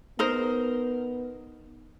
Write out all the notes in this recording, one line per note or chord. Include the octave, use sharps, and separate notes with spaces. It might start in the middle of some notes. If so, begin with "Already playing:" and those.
B3 D#4 A#4 C5